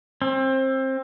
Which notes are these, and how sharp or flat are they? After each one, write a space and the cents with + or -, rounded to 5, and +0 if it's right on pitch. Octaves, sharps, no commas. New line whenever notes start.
C4 +25